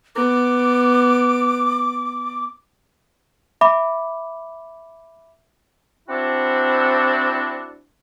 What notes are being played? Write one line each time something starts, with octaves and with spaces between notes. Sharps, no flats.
B3 D6
E5 B5 D6
C4 D4 E4 F#4